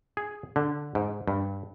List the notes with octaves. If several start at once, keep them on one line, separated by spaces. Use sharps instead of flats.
G#4
D3
G#2
G2